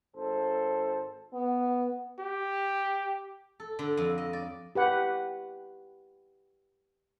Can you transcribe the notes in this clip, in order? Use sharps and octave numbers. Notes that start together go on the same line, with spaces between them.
G#1 A4 C5
B3
G4
A4
D3
F2
D#5
D5
G4 B4 F#5